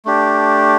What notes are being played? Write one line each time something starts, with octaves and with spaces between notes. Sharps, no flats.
A3 D4 G4